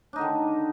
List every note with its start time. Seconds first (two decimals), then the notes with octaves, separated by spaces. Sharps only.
0.13 D4
0.16 D#4
0.18 D3
0.21 D#3